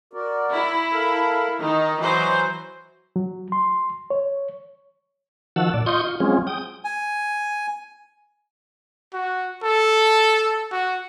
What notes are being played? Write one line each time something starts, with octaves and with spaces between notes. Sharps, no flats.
F#4 A#4 D5
E4
A4 A#4 F5
D#3 D#4 D#5
E3 F#3 C5
F#3
C6
C#5
D#3 F3 F#4 F#5 A5 E6
A#2 D5
F4 D#5 C6 C#6 D#6 G6
F4
F#3 G#3 C4 C#4 F4 G#4
G5 D#6
G#5
F#4
A4
F#4